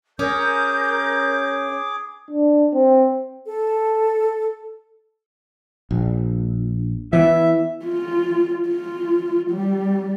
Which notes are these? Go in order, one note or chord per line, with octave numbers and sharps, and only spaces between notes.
C#4 G#4 A#4 D6 G6
D4
C4
A4
A#1
E3 B3 E4 E5
F4
F4
G3